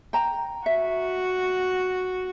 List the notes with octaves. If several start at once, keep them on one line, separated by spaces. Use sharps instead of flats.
G5 A#5
F#4 E5